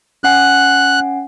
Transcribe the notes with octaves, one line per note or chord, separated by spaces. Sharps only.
C#4 F#5 G#5 F#6